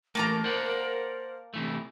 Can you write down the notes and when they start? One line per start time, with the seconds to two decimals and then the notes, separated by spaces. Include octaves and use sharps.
0.15 E3 A3 A#3 A#4 A5 A#5
0.44 C5 D5 F#5
1.54 C3 E3 A3